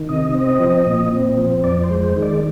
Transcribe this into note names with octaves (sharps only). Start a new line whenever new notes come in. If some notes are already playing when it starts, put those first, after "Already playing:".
Already playing: D#3
C3 D#5
C4
F3
A#2
C4
F3
F2 D5
C5
G#3
C5
D#3
D5